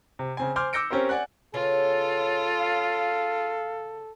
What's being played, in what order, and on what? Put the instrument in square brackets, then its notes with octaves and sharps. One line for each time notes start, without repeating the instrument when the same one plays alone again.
[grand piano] C3
C#3 C4 G#5
C5 G#5 C6 D6 F6 G6
D6 E6 G6 A#6 C#7 D7
C4 C#4 G4 A#4 C5
D5 F#5 G#5 F#6
[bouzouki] C#3 B3 C#4 [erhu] F4 [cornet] A4
[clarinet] F5